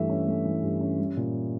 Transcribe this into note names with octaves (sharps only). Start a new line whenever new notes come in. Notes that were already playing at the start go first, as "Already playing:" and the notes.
Already playing: G2 E3 A3 E5
C#4
A3
E3
G2
C#4
G3
A#2